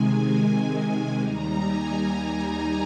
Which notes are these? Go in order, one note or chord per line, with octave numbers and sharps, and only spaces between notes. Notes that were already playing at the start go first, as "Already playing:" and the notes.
Already playing: C3 D#3 G#3 G#5
D#2 D#3 G3 A#5
G#5